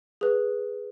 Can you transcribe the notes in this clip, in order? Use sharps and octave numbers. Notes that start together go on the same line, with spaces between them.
G#4 B4